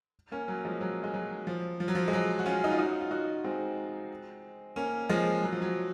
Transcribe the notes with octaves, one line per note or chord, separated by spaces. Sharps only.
A#3 C#4
F#3
F3 G#3
F#3
G#3
F#3
F3
F3
F#3
F3
G#3
F#3
F#4
C#4 F4
D#4
F4
D#4 F#4
F4
D#4 F#4
G#3 C4
A#3 C#4
F3 G#3
F#3
F3
F#3